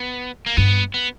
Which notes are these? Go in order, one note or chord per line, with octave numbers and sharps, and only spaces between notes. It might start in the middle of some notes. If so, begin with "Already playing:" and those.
Already playing: B3
A#3
G2 B3
B3